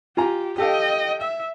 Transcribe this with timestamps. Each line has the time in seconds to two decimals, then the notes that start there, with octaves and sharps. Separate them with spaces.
0.17 F4 G4 G#5 A#5
0.58 G4 A4 D#5 F5 G5
1.21 E5